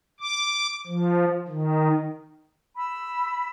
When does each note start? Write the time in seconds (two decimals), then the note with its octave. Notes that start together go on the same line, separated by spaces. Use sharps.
0.20 D6
0.87 F3
1.48 D#3
2.76 B5 E6